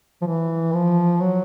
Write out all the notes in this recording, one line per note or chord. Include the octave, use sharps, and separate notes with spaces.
F3
E3
F3
F#3